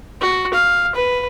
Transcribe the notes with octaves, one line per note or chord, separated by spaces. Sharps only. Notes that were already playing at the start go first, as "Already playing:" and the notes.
F#4
F5
B4